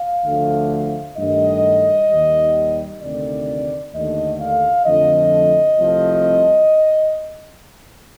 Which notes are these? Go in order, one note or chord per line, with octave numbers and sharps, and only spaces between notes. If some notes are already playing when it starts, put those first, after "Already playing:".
Already playing: F5
D2 D3 F3 A3
G2 D#3 A3 D#5
D#2 D#3 G3
D2 C3 D#3 A3 D5
D#2 D3 A3 D#5
F5
F2 D3 F3 A3 D#5
C2 C3 F3 A3